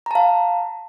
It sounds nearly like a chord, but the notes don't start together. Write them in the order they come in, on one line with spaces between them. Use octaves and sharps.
A#5 A5 F5